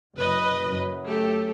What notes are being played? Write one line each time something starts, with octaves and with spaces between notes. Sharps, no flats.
F#1 B4 D#5
F#2
A3 G4 A4